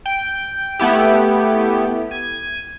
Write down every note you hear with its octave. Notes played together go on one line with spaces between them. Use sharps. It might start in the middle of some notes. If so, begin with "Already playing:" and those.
G5
A3 B3 E4 G4
G#6 D#7